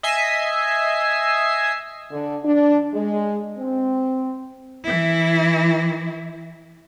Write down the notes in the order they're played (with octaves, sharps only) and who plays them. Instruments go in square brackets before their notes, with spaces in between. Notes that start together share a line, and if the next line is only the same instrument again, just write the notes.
[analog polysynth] D#5 E5 G#5 C7
[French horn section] D3
D4
G#3
C4
[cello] E3 E4